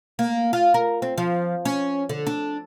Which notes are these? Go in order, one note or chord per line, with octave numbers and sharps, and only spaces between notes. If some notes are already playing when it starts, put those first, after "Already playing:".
A#3
F4
A#4
C4
F3
C#4
D3
D4